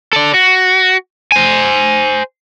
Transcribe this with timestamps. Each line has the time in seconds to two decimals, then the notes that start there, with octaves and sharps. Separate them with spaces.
0.13 A4 D5
0.34 F#4
1.32 C5 G#5